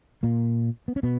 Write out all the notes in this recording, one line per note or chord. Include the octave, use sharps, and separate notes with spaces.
A#2 A#3
B3
C#4
B2 B3